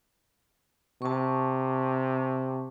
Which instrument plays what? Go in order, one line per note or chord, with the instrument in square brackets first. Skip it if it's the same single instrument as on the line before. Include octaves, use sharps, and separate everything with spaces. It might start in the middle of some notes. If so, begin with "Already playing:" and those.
[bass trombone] C3 [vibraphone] A5 C#6